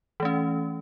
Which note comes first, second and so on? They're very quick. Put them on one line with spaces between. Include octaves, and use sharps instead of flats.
E3 A3 C#4